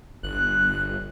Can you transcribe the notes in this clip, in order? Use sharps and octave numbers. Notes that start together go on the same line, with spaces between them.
G1 F#6